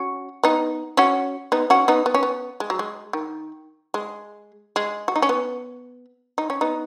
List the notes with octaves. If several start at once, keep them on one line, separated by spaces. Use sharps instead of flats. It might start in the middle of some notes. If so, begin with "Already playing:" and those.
Already playing: C#4 F#4
B3 D#4
C#4 F#4
B3 D#4
C#4 F#4
B3 D#4
B3
C#4
B3
G#3
F#3
G#3
D#3
G#3
G#3
F#4
D#4
C#4
B3
D#4
C#4
B3 D#4